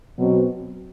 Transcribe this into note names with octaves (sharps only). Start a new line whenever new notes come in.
B2 F#3 C4